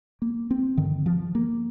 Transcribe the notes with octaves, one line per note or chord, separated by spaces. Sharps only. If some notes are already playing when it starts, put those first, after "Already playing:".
A#3
C4
G2 D3 D#3
F3
A#3